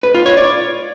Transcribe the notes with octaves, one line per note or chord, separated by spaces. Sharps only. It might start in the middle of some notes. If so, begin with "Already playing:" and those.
B4
F4
C#5
D5